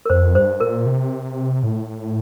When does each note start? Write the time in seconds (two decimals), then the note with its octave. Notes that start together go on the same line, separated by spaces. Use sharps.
0.06 A#4
0.10 F2 C5
0.35 G2 C5
0.60 A#2 A#4
0.86 C3
1.63 A2